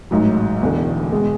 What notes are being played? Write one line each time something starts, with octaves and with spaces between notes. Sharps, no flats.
A1 G#2 F#3
E1 E2 D3
B2 G#3